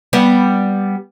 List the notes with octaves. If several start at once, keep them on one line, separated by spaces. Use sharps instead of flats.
G3 B3